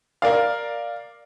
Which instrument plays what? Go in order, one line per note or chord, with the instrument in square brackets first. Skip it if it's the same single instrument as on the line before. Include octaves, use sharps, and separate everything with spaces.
[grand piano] A#4 D5 F5